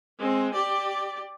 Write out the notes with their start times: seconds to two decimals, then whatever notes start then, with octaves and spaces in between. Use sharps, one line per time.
0.19 G#3 C4
0.54 G4 D5